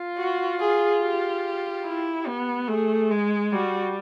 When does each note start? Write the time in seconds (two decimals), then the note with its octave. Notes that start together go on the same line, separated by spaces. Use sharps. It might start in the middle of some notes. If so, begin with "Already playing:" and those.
Already playing: F4
0.18 F#4
0.60 G#4
1.02 G4
1.85 E4
2.27 B3
2.68 A3 G#4
3.11 G#3
3.52 G3 F#4